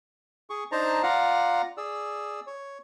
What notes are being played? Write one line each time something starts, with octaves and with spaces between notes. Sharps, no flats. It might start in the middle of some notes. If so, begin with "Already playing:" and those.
G#4 C#6
D4 D#4 C5 A5 A#5
F4 D5 F5 F#5 A#5
G#4 D5 E6
C#5